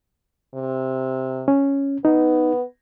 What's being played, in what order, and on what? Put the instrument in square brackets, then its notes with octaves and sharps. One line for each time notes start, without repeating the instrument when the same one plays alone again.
[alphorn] C3
[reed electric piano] C#4
[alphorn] B3 [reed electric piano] D#4